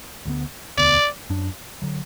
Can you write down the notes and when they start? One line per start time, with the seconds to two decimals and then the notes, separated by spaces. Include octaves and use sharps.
0.25 D2 D3 B3
0.77 E1 D2 D3 B3 D5
1.29 F#2 F#3 D4
1.82 D3 F#3